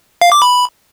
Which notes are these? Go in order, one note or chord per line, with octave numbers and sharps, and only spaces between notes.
F5
D6
B5